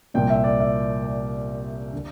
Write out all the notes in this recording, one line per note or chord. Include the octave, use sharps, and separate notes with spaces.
C2 A#2 F3 G5
E5
D5
E5
D5
D3